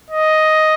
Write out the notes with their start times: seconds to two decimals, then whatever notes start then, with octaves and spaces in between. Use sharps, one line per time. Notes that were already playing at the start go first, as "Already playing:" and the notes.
0.11 D#5